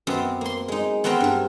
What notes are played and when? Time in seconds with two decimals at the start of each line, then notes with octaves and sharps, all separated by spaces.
0.07 F#2 B3 C4
0.41 A#3 C6
0.68 G#3 D#4
1.04 B3 C4 F#4 A#4 G5 A#5
1.20 G2 A#4